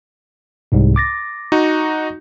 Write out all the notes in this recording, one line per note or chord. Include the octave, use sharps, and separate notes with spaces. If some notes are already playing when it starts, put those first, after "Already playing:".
C2 G#2 C3
D6 A6 A#6
D#4 F#4